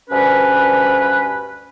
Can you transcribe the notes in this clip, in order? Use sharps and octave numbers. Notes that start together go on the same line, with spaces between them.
D2 G2 C#4 B4